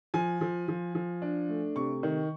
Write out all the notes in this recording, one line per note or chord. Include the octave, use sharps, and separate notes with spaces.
F3 G#5
F3
F3
F3
D4
A3
C3 C#6
D#3